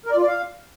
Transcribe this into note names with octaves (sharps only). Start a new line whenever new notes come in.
A#4
D5
F4
D5
F5